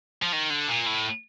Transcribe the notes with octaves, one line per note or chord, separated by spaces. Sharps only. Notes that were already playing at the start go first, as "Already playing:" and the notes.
F3
D#3
D3
A#2
A2